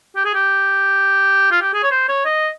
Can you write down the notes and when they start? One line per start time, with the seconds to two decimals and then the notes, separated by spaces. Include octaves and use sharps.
0.16 G4
0.25 G#4
0.35 G4
1.51 F4
1.62 G4
1.74 G#4
1.83 C#5
1.91 C5
2.09 C#5
2.25 D#5